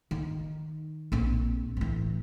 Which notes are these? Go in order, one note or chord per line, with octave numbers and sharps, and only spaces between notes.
D#3
A#1 C4
A2 E3